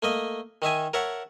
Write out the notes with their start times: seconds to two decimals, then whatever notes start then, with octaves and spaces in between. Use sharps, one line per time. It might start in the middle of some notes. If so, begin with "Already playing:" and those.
0.03 A3 A#3 D#5
0.62 D#3 D#4 E5 G#5
0.94 A#4 C#5 E5 F#5 A5